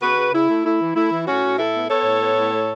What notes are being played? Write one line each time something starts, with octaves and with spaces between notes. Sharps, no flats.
C#3 F#4 B4
C#3
C#3 E4
A3
A3 E4
E3
A3 E4
E3
A2 C#4 F#4
A2
A2 E4 A4
B3
B3 A4 C#5
A2
B3
A2
A3